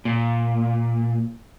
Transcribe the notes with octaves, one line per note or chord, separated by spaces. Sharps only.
A#2